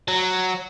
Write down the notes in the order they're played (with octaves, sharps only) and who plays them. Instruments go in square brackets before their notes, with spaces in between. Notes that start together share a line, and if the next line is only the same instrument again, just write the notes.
[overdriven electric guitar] F#3